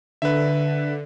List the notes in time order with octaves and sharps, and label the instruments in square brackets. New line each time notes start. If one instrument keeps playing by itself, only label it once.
[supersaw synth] D3 [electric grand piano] B4 E5